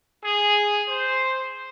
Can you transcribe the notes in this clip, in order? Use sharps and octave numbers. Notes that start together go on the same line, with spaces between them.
G#4
C5